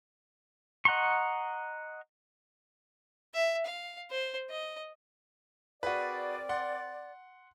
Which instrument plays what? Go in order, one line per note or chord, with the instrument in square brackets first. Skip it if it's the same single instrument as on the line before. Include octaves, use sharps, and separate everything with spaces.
[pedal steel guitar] D#5 F#5 A#5 C6 C#6
[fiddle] E5
F5
C5
D#5
[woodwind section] C4 A#4 D5 [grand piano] F#4 G#4 B4
[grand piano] F#5 C6